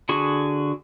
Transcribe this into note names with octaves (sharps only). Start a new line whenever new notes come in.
D3 F#4 G#4